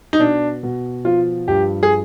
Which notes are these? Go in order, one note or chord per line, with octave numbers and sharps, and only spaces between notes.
D#4
B2 D4
B2
F3 F4
G2 G4
G#4